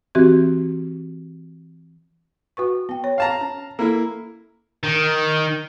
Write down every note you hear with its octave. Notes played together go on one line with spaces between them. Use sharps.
E3 C4 F#4 G4
F#4 B4 C#6
B3 G5
C#5
F5 A5 A#5
C#4
A#3 E4 A4
D#3